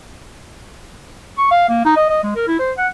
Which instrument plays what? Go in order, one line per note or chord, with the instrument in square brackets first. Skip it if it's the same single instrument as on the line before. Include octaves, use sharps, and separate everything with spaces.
[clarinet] C#6
F5
A#3
D#4
D#5
D#5
G#3
A#4
E4
C5
F#5